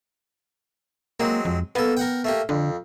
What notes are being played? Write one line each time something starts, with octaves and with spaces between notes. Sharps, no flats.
F#3 G#3 A#3 C4
F2
A#3 B3 A4
A#4 F#5 G5
A3 A#3 G4
F2 D3